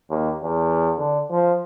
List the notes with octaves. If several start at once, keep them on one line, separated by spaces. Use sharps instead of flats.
D#2
E2
D3
F3